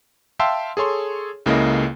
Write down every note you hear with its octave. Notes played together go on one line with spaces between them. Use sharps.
E5 F5 G5 A5 C6 E6
G#4 A4 C#5 C6
C#2 C#3 A#3 E4 A4 D#5